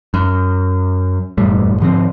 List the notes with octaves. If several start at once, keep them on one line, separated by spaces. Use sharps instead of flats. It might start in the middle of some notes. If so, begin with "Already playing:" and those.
F#2
E1 F#2 A2 G3
G#2 D3 F3 C4